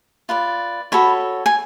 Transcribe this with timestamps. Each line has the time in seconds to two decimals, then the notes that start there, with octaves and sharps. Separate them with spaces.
0.29 F4 B4 D5
0.92 F#4 A4 C#5 B5
1.46 G#5